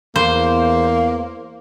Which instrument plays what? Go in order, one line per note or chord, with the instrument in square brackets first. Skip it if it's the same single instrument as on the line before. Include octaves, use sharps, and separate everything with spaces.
[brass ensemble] E2 [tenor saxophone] A#3 [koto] C5